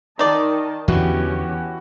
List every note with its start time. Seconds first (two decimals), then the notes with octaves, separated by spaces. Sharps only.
0.19 D#3 D#4 D5 D#5 A5
0.88 E2 D3 E3 F3 B3 C#4 F#4 G4